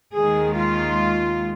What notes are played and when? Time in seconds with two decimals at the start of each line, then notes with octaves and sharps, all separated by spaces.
0.15 D#2 D#3 G#3 G#4
0.56 F4